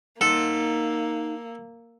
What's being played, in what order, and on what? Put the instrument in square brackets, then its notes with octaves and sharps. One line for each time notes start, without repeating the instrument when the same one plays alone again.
[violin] A#3 [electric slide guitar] D#4 F#5 [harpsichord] A4